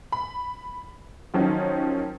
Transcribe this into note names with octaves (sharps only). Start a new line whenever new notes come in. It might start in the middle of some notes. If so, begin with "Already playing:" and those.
B5
D#3 F3 F#3 C#4 D#4